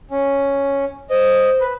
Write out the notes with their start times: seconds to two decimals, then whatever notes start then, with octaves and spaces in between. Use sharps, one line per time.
0.11 C#4
1.10 C5 D#5
1.61 B4